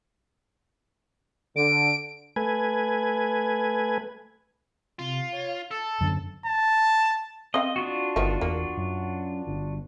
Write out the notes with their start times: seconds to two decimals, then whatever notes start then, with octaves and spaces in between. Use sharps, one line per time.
1.56 D3 D7
2.36 A3 B4 G#5
4.99 C3 F4
5.32 C#5
5.71 A4 A6
6.01 F#2 D3
6.46 A5
7.54 C4 D#5 F5
7.76 D4 F4 F#4
8.16 G1 D#3 F3 B3
8.41 E2 A#3
8.77 F#2
9.47 G1